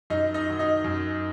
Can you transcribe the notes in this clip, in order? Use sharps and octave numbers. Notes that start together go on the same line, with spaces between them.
F#2 D#4 D#5
D#4 D#5
D#3 F#3
D#4 D#5
F#2